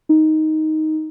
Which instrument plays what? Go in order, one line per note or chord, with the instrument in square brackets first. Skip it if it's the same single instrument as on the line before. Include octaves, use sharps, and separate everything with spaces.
[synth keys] D#4